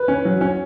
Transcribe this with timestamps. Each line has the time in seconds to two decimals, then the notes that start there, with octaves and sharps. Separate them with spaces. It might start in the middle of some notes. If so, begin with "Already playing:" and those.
Already playing: B4
0.08 C#4
0.25 F#3
0.41 C#4